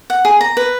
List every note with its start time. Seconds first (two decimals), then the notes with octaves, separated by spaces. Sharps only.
0.10 F#5
0.25 G#4
0.41 A#5
0.57 B4